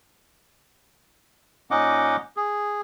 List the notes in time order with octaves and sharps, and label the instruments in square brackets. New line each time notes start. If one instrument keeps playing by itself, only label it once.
[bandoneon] A#2 C#4 D#4 D#5 F#5 D6
G#4